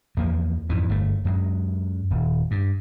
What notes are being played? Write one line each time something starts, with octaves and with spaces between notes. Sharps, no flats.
E2 F3 A#3
F2 G#2 E3
G1 A3
F#2 F#3 G#3
D#1
G2